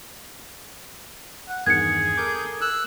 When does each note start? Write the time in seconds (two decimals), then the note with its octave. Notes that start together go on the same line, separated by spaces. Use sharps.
1.49 F#5
1.66 E2 G2 D#3 G#4 G#6 C#7
2.17 A4 A#4 D6 G6
2.61 E6 F#6